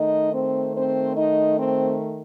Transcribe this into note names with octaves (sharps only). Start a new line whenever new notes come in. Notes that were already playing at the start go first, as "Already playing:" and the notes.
Already playing: D#3 A3 D#4 D#5
C4 C5
C4 C5
D#4 D#5
C4 C5